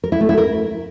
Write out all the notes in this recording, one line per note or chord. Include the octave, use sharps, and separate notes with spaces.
A#4
E4
A3
E4
A#4